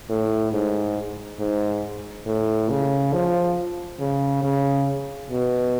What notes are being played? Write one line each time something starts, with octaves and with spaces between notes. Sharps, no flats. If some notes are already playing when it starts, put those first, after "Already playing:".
A2
G#2
G#2
A2
C#3
F3
C#3
C#3
B2